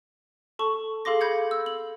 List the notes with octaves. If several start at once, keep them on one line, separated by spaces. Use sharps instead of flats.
A4 A5 C#6
G#4 A4 F5 C6 D6 A#6
B5 G6 G#6 C#7
E6
F#7